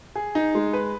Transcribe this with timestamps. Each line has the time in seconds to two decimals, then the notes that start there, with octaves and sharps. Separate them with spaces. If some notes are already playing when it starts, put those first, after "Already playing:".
0.16 G#4
0.35 D#4
0.55 G#3
0.73 B4